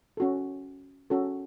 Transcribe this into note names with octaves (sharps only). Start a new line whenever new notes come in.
C#4 F#4 A4
C#4 F#4 A4